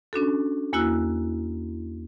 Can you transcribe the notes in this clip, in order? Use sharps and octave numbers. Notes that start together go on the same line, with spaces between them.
C#4 D4 F#4 A4
E2 A#3 E4 F#4 E6 F#6